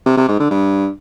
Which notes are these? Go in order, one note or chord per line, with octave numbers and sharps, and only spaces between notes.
C3
C3
G#2
D3
G2